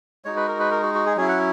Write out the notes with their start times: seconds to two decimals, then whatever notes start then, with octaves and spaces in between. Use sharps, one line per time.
0.25 G#3 D#4 F#4 C#5
0.36 B4
0.48 A#4
0.59 B4
0.71 A#4
0.83 F#4
0.95 F#4
1.06 G#4
1.17 F#3 C#4 E4 G#4
1.28 F#5